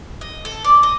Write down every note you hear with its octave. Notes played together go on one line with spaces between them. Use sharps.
D#5
A4
D5
D#5